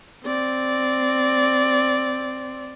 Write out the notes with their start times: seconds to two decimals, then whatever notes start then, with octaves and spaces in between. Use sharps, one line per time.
0.24 C4 D5